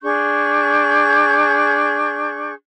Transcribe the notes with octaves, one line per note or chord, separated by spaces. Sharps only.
D4 G#4 C#6 G6